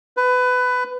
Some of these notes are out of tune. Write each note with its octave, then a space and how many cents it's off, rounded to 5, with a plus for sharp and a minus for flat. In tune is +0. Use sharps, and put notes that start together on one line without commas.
B4 +20